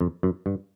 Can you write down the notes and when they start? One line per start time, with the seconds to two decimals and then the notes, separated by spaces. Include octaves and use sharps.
0.01 F2
0.23 F#2
0.46 G2